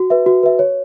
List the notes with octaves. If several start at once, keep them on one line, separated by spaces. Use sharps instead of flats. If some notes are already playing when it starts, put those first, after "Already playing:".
Already playing: F#4
B4 E5
F#4
B4 E5
C#5